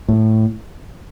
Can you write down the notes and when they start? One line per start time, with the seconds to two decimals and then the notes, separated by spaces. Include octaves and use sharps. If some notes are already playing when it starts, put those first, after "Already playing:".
0.08 A2